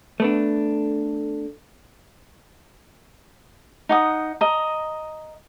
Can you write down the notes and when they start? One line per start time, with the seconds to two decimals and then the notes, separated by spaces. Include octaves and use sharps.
0.20 A3 B3 D4
3.89 D#4 F#5 D#6
4.41 D#5 A#5